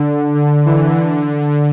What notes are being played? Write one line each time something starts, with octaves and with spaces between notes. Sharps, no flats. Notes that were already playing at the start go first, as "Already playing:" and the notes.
Already playing: D3
D3
E3
D3